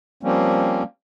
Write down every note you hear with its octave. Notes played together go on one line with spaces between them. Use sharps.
F3 G3 A#3 C4 C#4